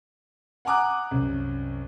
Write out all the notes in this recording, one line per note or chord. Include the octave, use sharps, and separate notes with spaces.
F#5 G#5 A#5 D6 D#6 F#6
C2 F#2